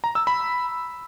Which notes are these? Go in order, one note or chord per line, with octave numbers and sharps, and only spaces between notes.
A#5
E6
B5